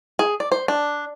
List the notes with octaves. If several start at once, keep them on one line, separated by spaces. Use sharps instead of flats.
G#4
D5
C5
D4